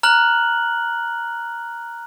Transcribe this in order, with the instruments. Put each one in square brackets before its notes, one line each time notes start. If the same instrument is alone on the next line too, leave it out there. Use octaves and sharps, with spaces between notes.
[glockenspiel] A#5 F6 F#6 F#7